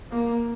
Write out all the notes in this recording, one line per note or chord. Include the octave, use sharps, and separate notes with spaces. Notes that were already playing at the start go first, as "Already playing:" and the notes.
A#3